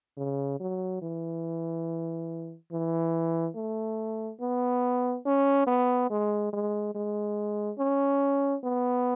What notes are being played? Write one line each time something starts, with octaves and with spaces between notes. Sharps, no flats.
C#3
F#3
E3
E3
A3
B3
C#4
B3
G#3
G#3
G#3
C#4
B3